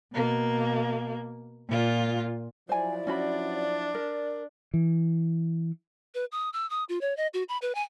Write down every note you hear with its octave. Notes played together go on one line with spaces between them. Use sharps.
B2 A#3
A#2 F4
F3 F#3 E4 C5 D5 G#5
C#4 D4 F#4 B5
A#4
E3
B4
D#6
E6
D#6
F4
C#5
D#5
F#4
B5
B4
G#5